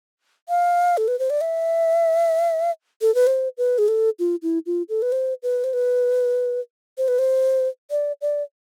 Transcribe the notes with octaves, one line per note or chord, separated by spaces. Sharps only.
F5
A4
B4
C5
D5
E5
A4
B4
C5
B4
G#4
A4
F4
E4
F4
A4
B4
C5
B4
C5
B4
C5
B4
C5
D5
D5